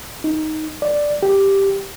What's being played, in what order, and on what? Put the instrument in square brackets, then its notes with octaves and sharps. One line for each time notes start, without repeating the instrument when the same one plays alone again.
[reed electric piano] D#4
D5
G4